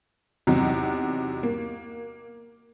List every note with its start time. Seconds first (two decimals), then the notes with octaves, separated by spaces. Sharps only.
0.47 E2 C3 F#3 D#4
1.43 A#3